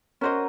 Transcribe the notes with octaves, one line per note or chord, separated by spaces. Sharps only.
C#4 F#4 A#4 C5 D#5